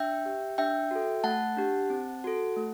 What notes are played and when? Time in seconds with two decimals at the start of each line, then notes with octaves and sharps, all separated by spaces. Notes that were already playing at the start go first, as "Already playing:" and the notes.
Already playing: D4 E5 G5
0.26 G4
0.58 D4 E5 G5
0.91 F#4 A4
1.24 A3 F#5 A5
1.57 D4 G4
1.90 C4
2.24 F#4 A4
2.56 A3